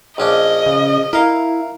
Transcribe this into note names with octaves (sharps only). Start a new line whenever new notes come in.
A#1 C#4 D4 D#5
C#3
E4 A#4 F5